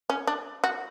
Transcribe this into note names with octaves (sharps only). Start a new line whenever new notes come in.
C#4
D4
F#4